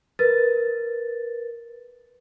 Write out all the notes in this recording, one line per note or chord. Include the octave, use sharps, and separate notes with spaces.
A#4 B4 A6